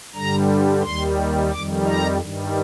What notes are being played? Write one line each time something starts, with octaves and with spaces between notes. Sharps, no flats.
G2 D3 G3 A#5
D#2 D#3 G3 C6
F2 D#3 G3 D6
A#5
G2 D#3 G3